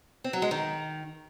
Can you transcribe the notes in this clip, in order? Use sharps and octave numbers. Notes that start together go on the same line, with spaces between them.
C4
F#3
G#3
D#3